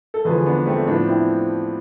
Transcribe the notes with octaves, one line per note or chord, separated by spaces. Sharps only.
A4
E2 D3 F3 G#4 B4
B3 D4
A3 C4
A2 F3 B3 D4
C4 E4